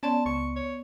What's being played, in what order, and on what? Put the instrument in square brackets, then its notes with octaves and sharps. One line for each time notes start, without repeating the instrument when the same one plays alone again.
[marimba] B3 D5 C6 [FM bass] C#4 [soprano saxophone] A5
[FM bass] C#2 [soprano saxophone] C#6
[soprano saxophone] C#5